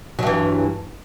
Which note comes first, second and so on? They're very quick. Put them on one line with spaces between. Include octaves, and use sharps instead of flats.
F#3 G2 E3